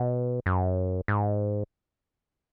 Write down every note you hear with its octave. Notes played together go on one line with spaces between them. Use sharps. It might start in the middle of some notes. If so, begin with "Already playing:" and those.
Already playing: B2
F#2
G#2